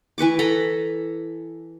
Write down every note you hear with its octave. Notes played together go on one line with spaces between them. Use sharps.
E3 B4 C#6 D6
A4 A#5 B5